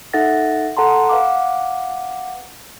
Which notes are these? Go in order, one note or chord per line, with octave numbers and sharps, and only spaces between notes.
D#4 A4 E5 F#5 A6 A#6
A4 F#5 A5 A#5 C6
B4 F5 F#5 D6